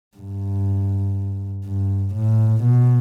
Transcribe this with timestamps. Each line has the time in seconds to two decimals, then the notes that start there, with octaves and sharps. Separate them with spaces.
0.17 G2
1.66 G2
2.15 A2
2.63 B2